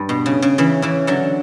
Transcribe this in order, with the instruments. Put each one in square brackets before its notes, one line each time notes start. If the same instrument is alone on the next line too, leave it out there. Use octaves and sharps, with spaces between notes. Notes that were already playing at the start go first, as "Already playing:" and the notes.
Already playing: [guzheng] G2
B2
C#3
C#3
C#3 E3
C#3 E3
D3 F#3